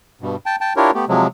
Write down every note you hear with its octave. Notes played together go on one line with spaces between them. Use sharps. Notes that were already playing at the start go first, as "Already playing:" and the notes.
G2 B2
G5 A5
G5 A5
D4 E4 F4 G4 A#4 C#5
A3 B3 G4
C3 F3 F#3 G#3